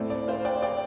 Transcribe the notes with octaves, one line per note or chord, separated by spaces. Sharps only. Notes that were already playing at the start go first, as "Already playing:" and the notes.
Already playing: A2 A3 C4 D5
D5
C5 F5
D5 G5
D5 G5